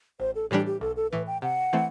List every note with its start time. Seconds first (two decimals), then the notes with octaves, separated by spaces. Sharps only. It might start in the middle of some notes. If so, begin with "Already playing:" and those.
0.20 A1 C5
0.35 A4
0.51 A2 E3 G3 D4 G4
0.66 G4
0.81 B1 A4
0.96 A4
1.11 A2 E3 B4
1.27 G5
1.42 C3 F#5
1.73 E3 A3 C4